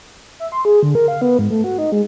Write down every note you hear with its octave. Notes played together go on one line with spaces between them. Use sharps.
E5
C6
G#4
D3
A#4
F5
B3
G#2
A3
F#4
D#4
G#3